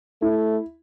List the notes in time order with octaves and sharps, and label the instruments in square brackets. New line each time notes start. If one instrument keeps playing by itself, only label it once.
[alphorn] A3 [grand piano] E4